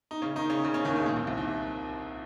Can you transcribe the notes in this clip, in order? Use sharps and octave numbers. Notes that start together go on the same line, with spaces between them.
D#4
C#3 C#4
D#3 D#4
C#3 C#4
C#3 C#4
C#3 C#4
D#2 D#3
C#2 C#3
A#2
C2 C3
C2 C3
D#2 D#3